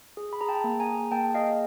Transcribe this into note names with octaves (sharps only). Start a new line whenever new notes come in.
G#4
B5
G#4 A#5
G5 A5
A#3
G#5 A#5
G#4
A#3 G5 A5
G#4 D#5 F5